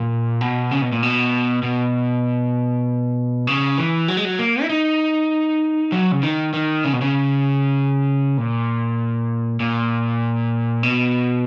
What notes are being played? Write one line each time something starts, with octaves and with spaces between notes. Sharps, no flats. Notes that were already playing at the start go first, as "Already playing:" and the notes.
Already playing: A#2
B2
C#3
B2
A#2
B2
B2
C#3
E3
F#3
G#3
F#3
A#3
E4
D#4
F#3
C#3
D#3
D#3
C#3
B2
C#3
A#2
A#2
B2